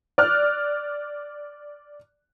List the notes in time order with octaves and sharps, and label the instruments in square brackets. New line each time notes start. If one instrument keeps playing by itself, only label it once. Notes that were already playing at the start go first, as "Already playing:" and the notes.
[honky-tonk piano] D5 F6 F#6